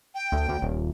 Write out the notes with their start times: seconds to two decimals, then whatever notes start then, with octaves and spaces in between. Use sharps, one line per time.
0.15 G5
0.32 D2
0.49 D2
0.62 D#1